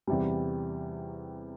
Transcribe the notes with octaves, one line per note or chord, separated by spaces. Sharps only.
E2 C3 G3